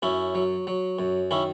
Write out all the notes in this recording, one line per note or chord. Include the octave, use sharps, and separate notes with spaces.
F#2 C#4 E4
F#3
F#3
F#2
D#3 C#4 E4